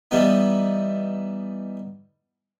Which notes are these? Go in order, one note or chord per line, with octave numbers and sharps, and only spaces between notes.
E3 G3 B3 D#4